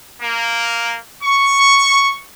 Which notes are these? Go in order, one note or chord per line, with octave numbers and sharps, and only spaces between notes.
A#3
C#6